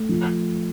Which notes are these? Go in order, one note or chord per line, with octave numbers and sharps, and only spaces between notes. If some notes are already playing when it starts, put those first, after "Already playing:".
Already playing: A3
F3